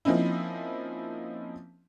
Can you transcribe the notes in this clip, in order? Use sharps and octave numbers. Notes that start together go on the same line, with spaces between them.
F3 A#3 C4 C#4 D#4 E4